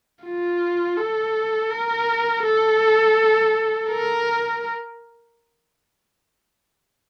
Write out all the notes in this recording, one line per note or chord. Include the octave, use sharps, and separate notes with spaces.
F4
A4
A#4
A4
A#4